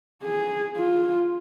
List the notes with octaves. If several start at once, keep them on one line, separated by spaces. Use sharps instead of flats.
G#4
F4